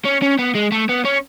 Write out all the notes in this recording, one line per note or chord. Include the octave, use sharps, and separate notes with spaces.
C#4
C#4
B3
G#3
A3
B3
C#4